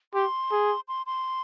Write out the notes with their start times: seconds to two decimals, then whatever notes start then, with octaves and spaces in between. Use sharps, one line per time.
0.14 G4 C6
0.51 G#4
0.88 C6
1.06 C6